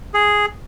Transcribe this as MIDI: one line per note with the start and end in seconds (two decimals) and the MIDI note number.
0.14 0.46 68